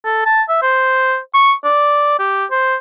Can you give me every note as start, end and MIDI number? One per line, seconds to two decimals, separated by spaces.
0.05 0.22 69
0.26 0.43 81
0.49 0.62 76
0.62 1.18 72
1.34 1.53 85
1.65 2.18 74
2.19 2.46 67
2.51 2.76 72